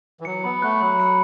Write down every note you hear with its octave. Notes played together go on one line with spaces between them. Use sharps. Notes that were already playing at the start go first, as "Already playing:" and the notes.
E3
F#3 C#7
B3 B5
A3 F#6
F#3 B5
C#7